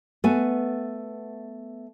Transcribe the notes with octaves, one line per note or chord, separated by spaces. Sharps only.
A3 B3 G#5